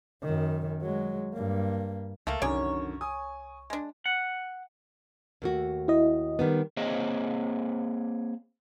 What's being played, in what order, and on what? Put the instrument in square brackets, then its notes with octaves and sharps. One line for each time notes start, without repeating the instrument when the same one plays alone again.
[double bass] F#2 D#3
F#3 G#3
G2 A#3
[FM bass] C#2 [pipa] A3 A#3 F5
[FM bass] C2 [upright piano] F#2 D3 D#3 [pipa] G#4 D5 [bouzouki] C#5
[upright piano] G#5 D#6
[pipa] G#3 D4
[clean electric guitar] F#5
[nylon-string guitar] D#2 A3 F#4
[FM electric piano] E4 D#5
[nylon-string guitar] D#3 G3 B3
[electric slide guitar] A#3 C4 G#4 C5 C#5 D#5